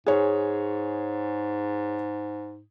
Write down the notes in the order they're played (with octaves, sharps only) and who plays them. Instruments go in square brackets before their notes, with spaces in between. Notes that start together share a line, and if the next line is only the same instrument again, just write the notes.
[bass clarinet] G#2 [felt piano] G#4 C#5